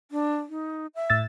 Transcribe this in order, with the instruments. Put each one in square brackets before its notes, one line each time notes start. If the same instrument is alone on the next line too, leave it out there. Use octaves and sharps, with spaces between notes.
[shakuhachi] D4
D#4
E5
[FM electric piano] A2 E6 A6